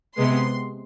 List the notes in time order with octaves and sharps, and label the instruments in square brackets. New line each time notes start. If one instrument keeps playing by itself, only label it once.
[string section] C3 G#3 B3 C6